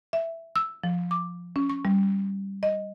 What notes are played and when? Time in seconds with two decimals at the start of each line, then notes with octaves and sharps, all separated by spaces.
0.13 E5
0.56 E6
0.84 F3
1.11 D6
1.56 C#4
1.70 C#6
1.85 G3
2.63 D#5